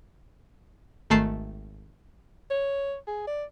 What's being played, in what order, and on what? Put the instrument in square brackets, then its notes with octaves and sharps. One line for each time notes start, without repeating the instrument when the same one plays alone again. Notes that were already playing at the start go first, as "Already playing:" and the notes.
[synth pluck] G#1 D#3 A3 A4 C7
[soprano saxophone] C#5
G#4
D5